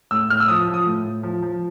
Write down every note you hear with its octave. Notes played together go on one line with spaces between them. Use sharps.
A2 E6
A2 F6
E6
F3 D#6
F3
D#6
A2
A2
F3
F3